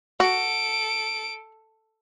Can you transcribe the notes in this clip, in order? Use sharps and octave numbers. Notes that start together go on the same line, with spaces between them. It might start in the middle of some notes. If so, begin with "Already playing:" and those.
F#4 A4 D7